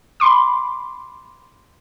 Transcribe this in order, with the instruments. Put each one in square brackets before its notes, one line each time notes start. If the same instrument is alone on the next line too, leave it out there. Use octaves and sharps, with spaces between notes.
[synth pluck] B5 C6 D6